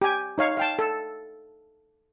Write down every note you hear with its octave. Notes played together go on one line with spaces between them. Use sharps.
G4 G#5
D#4 C#5 F5
F5 G5 A5
A4